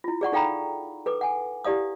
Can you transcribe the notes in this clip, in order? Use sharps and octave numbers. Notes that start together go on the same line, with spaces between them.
E4 F4
G#4 D5 F#5 C#6
D#4 A4 F5 G5 A#5 B5
A4 B4 D6
F#5 G#5
E4 G4 D5 F5 D#6